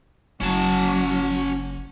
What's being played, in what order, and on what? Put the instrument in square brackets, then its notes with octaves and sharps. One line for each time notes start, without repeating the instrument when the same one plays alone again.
[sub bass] F#1 [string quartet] F#3 F#4 [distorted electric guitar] C#4 A5